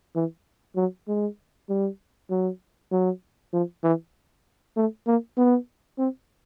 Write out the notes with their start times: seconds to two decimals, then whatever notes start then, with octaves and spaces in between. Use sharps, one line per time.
0.16 E3
0.76 F#3
1.08 G#3
1.69 G3
2.30 F#3
2.91 F#3
3.53 F3
3.83 E3
4.76 A3
5.07 A#3
5.38 B3
5.98 C4